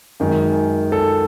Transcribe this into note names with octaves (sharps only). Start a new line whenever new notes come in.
F#2 D#3 G#3
A4